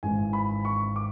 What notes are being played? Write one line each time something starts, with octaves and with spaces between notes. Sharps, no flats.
G#1 G#2 E3 G#5
B5
C#6
D6